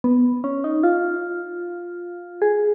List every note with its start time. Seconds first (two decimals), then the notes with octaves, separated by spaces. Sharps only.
0.04 B3
0.44 C#4
0.64 D#4
0.83 F4
2.42 G#4